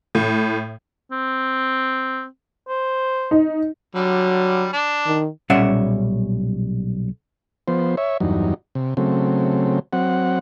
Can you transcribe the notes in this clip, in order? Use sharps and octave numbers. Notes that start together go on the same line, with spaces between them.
A2
C4
C5
D#4
D3 F#3 G3
D4
D#3
B1 A#2 G3 C#4 E5 F#5
F3 B3 C5
C#5 E5
E2 G2 F#3 D#4
C3
C#3 F#3 A3 C4
F#3 C4 F#5